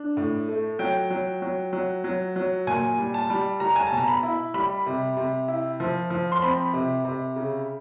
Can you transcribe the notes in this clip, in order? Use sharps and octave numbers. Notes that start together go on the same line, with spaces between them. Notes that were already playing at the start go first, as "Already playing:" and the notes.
Already playing: D4
A2
A3
F#3 G5
F#3
F#3
F#3
F#3
F#3
A#2 G#5
G3
A5
G3
G3 A#5
G#5
A5
B2
A#5
B5
E4
G3 B5
C3
C3
E4
F3
F3
C6
C4 B5
C3
C3
C#3